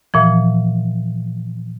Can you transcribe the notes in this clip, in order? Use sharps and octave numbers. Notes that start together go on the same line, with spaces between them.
A#2 E3 F3